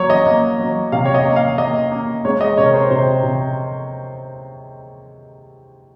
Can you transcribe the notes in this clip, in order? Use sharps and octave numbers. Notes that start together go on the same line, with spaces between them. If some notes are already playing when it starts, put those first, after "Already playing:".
Already playing: F#3 A#3 C#5
D#5
A#3
F#3
C3 F5
C#5
D#5
A#3
F5
A#3 D#5
A#3
G#3 C#5
D#5
C3 C#5
A#4
C5
C3 C5
C3